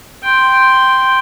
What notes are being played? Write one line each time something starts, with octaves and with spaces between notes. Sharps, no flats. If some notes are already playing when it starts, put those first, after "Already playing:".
G5 C6